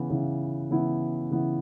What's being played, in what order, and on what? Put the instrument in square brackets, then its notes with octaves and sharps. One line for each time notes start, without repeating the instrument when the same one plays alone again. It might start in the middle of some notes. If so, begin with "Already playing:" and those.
Already playing: [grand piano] C#3 E3 B3 E4
C#3 E3 B3 E4
C#3 E3 B3 E4
C#3 E3 B3 E4